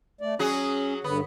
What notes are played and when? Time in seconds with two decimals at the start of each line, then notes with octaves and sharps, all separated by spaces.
0.21 A3 D5
0.39 F#3 C#4 F#4 G#4
1.04 G2 D3 B3